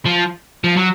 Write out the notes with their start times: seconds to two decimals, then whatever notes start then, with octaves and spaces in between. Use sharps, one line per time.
0.05 F3
0.64 F3
0.76 F#3